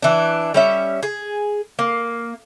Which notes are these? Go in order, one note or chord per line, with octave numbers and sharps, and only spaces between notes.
E3 D4
G3 C#4 E5
G#4
A#3